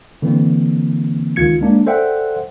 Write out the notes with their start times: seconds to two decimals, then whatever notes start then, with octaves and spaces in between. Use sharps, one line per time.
0.22 D3 E3 A#3 C4
1.36 C#2 D#3 F4 G#6 C#7
1.61 G#3 A#3 D4
1.86 A4 C5 D5 E5 F#5 G5